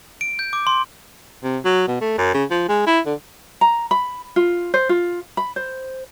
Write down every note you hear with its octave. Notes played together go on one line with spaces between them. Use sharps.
D7
G6
D6
C6
C3
F#3
B2
A3
F#2
C#3
F3
G#3
E4
D3
A#5
B5
F4
C5
F4
B5
C5